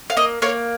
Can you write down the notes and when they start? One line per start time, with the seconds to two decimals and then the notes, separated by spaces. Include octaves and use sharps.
0.10 F5
0.17 A#3 D#5
0.42 A#3 C#5